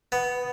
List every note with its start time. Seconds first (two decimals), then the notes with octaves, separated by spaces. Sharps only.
0.12 B3